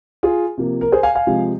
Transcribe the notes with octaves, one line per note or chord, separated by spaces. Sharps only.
F4 G#4
C3 F3 A#3
A#4
G#4 C5
F5 G#5
F5 G#5
C3 F3 G#3